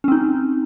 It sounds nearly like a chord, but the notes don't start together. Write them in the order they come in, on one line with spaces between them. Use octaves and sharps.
C#4 C4 D#4